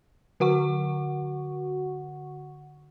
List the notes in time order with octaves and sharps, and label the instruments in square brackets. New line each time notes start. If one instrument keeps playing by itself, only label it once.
[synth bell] D3 F#4 F#5 C#6